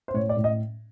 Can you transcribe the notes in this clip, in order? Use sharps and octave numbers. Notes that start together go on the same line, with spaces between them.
C5
A2 C#5
D5
A2
D#5